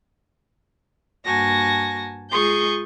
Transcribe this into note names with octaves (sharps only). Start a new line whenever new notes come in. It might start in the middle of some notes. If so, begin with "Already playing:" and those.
G2 A#3 F#4 G#5 A5 A#6
G#3 F4 G#4 C#6 D#6 G6